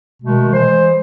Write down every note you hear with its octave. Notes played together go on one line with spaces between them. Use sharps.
B2 D#3 G#3 A3
E3 G#3 C5